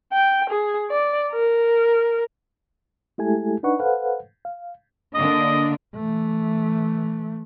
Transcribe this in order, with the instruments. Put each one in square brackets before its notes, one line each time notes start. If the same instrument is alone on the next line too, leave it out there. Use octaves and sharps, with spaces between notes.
[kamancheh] G5
G#4
D5
A#4
[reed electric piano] G#3 A3 E4 G4 A4 G#5
D4 D#4 B4 F#5 C#6
A4 B4 C5 F5 F#5
F5
[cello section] D3 A#3 D4 [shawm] D#5
[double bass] E3 A3